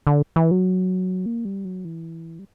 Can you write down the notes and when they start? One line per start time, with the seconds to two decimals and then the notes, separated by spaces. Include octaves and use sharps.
0.07 D3
0.36 E3
0.51 F#3
1.26 A#3
1.45 G3
1.65 F#3
1.85 E3
2.39 G3